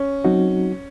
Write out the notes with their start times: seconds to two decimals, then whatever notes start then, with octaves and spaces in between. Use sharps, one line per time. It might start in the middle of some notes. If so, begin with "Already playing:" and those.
Already playing: C#4
0.24 F#3 C4 D#4 F#4